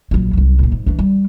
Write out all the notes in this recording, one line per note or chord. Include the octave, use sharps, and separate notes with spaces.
A#1 F#3
C2 F#3
A#2 A#3
G#2
E3 D4
G3